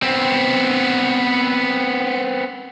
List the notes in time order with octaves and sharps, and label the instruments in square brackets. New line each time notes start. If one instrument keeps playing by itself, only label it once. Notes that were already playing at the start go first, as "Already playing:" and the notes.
[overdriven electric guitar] B3 C4